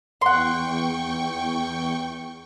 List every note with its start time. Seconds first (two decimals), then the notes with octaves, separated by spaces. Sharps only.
0.21 E2 F#5 G5 C6 C#6